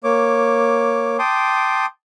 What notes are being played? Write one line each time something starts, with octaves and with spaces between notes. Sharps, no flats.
A#3 C#5 D6
G5 A5 C6 D6 D#6